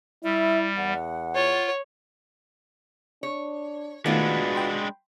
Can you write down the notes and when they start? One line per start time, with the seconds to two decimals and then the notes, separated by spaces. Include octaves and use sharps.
0.24 G3 E4 E5
0.77 E2 F#5
1.35 F4 C#5
3.23 D4 C#5
4.06 D#3 G#3 A3 B3 D4 F4 F#4
4.55 G5 B5 C6